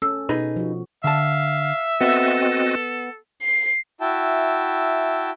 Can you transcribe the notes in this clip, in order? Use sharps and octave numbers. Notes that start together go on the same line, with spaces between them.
C#4 A4 E6
B2 D#4 G#4 B4
F3 F#4
D3 E5 F5 A5
B3 C4 F#4 A4 D#5
C7
E4 F#4 E5 G5 A5